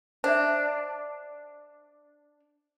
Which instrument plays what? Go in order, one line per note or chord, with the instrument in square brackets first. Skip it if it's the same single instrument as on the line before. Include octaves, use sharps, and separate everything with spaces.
[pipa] D4 [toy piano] C5 D5 E5